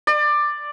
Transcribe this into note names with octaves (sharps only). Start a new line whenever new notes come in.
D5